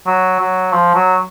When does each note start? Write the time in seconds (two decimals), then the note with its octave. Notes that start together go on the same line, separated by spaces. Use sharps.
0.07 F#3
0.40 F#3
0.73 F3
0.95 F#3